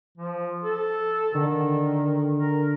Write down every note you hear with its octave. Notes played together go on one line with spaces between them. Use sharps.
F3
A4
D3 D#3
A#4